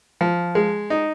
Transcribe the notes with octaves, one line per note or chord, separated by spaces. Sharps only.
F3
G#3
D#4